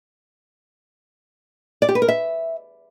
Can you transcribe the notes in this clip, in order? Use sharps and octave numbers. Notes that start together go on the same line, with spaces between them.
D5
G4
B4
A#4
E5